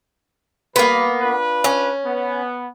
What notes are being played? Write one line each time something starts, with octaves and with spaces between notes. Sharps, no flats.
G3 A#3 B3 B4
D4 F4 B4
C#4
B3